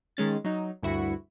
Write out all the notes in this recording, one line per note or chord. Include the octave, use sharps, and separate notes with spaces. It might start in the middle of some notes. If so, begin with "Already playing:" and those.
D#3 G#3 C#4 A6
F#3 D#4
D2 G2 E4 F#4 C#7